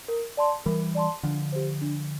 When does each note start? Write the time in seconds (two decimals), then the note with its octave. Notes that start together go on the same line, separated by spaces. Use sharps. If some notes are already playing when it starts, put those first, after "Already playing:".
0.08 A#4
0.37 D5 A5 C6
0.66 E3 G3 A#4
0.95 D5 A5 C6
1.23 D3 F3 D4
1.52 G4 C5
1.81 D4